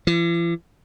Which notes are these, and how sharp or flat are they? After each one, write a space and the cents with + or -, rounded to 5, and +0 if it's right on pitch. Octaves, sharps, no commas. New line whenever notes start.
E3 +45